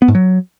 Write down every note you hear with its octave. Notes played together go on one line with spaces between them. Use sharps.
B3
G#2
F#3